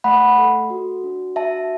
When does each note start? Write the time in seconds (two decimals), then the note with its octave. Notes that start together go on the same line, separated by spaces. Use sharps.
0.04 A3 F#5 B5
0.38 A4
0.70 F#4
1.04 D4
1.36 F#4 E5 A5